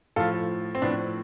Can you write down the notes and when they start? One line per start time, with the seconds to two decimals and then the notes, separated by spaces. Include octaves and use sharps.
0.16 A2 F3 F4 A4
0.75 C4
0.82 A2 F3 B3 D4